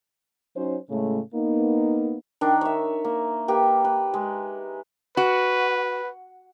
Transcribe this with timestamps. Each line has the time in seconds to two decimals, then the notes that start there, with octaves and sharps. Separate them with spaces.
0.55 F#3 C#4 D#4 C5
0.90 A2 C#3 G#3 A3
1.34 A#3 B3 D#4
2.41 D#3 D4
2.61 C#5 E5
3.04 A#3
3.48 A#3 G4 B4
3.84 B4
4.14 G#3
5.17 F#4 B4